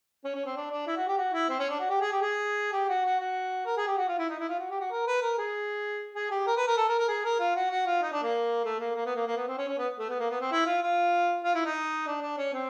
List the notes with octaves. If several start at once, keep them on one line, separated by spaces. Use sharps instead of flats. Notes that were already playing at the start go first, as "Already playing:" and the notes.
C#4
C#4
C4
D4
D4
E4
F#4
G4
F#4
E4
C4
C#4
D4
F#4
G4
G#4
G4
G#4
G4
F#4
F#4
F#4
A#4
G#4
G4
F#4
F4
E4
D#4
E4
F4
F#4
G4
F#4
A#4
B4
A#4
G#4
G#4
G4
A#4
B4
A#4
A4
A#4
A#4
G#4
A#4
F4
F#4
F#4
F4
D#4
D4
A#3
A3
A#3
A#3
B3
A#3
A#3
B3
C4
C#4
C#4
B3
A3
B3
A#3
B3
C4
E4
F4
F4
F4
E4
D#4
D4
D4
C#4
C4